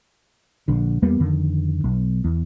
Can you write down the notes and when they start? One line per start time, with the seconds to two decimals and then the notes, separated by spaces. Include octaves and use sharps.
0.68 A#1 D3
1.02 E2 G3 A#3 B3
1.20 F2 D3 D#3
1.84 B1
2.25 E2